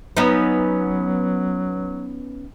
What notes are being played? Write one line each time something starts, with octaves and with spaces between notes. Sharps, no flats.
F#3 B3 C#4 D#4